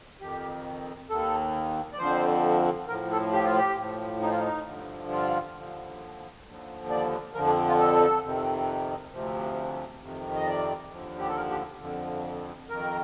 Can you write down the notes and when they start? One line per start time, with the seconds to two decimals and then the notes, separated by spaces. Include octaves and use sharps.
0.21 F2 D#3 G4
1.09 D#2 D#3 A4
1.93 D5
1.99 F2 D3 F3 C5
2.88 A2 F3 A#4
3.11 A4
3.33 G4
3.44 F4
3.57 G4
3.78 A2 F3
4.22 D#4
4.31 F4
4.39 D#4
4.67 G2 D3 F3
5.11 F4
5.56 D#2 D3 F3
6.45 D#2 D3 F3
6.90 D5
7.34 F2 D3 F3 A#4
7.46 D4
7.68 F4
7.78 A4
8.23 F2 C3 D#3
9.13 D2 C3 F3
10.02 F2 C3 D#3
10.36 D#5
10.46 D5
10.91 D#2 D3 F3
11.18 G4
11.27 A4
11.36 A#4
11.51 G4
11.81 F2 D3 F3
12.70 F2 D#3 A#4